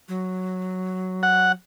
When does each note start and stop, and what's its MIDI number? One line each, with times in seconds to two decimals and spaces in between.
0.08 1.53 54
1.23 1.52 78